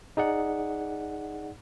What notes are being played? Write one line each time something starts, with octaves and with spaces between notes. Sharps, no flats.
D#4 G#4 D5 F#5